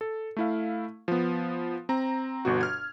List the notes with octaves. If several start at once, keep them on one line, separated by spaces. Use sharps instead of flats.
A4
A3 E4 F5
F3 B3
C4 A#5
G1 B2 F#4
F6 G#6